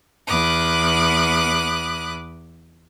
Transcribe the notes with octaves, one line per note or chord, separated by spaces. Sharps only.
E2 B5 D6 D#6 F#6